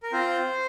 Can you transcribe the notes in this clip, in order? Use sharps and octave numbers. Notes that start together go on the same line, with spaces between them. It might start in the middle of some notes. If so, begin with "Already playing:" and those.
A#4
C4 F4 C5